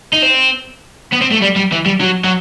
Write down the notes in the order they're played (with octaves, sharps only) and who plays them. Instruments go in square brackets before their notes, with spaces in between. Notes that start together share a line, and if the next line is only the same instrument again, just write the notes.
[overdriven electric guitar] D#4
C4
B3
C4
A3
G3
G3
E3
G3
F#3
F#3